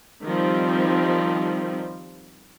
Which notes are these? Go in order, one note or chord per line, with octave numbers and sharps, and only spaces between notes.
D#3 F3 G3 C4